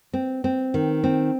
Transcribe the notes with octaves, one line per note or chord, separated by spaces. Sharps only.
C4
C4
D#3
C4